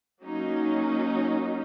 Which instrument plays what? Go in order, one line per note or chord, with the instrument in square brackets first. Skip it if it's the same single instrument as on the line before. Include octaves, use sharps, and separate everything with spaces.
[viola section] F#3 A#3 C#4 D#4